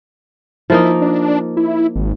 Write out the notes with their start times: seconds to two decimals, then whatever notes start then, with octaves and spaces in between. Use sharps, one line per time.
0.70 F3 A#3 D#4 E4
1.02 D4
1.57 E4
1.96 G#1